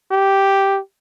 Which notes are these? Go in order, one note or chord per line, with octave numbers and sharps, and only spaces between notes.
G4